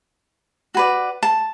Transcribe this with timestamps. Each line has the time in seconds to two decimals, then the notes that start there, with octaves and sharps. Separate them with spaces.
0.74 F#4 B4 D5
1.23 A5